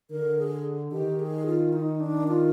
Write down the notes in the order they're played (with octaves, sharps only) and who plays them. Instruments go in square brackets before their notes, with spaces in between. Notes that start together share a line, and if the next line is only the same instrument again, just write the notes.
[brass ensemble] D3 [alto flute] A#4
[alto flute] G#4
[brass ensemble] D#3 [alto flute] G4
[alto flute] G#4
F4
D#4
D4
F4